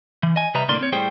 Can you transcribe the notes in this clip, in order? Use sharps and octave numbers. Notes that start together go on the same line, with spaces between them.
E3
D#5 G#5
C3 G3 B4 D#5 E5 A#5
C2 A2 D3 A#3 D5 C6
C4 C#5
A2 G3 G#4 C5 G5